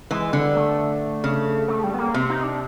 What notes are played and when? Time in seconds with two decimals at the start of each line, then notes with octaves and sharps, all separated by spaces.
0.11 E3 G#3
0.32 D3 G3
0.56 A3
1.24 C#3
1.68 A3
1.84 G3
1.94 B3
1.98 A#3
2.14 C3
2.30 D#4
2.44 D4